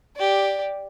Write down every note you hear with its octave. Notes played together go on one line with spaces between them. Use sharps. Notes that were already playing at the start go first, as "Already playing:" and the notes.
G4 D5